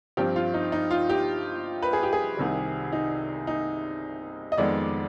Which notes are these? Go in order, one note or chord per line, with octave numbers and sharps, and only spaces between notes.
G2 F3 C4 G4
F4
D#4
D#4
F4
G4
B4
G#4
G4
G#4
C2 C3 D#3 G3
D#4
D#4
D#5
F2 D#3 G#3 B3 D5